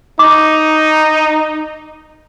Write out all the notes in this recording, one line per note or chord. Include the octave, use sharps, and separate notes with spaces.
D#4 D6